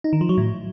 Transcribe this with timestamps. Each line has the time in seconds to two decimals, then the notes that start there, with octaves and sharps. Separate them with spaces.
0.04 D#4
0.13 D#3
0.21 F3
0.29 F#3
0.38 A2